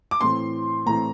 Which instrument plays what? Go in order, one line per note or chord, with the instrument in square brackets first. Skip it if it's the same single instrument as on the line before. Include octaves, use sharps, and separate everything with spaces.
[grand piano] D6
A2 E3 A3 C4 C6
A2 E3 A3 C4 A#5